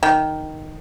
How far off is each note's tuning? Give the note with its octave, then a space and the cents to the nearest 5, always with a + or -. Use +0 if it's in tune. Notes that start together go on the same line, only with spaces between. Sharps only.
D#3 +0 G5 -15